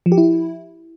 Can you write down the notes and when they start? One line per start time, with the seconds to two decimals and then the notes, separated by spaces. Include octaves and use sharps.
0.06 F3
0.12 G4
0.18 E4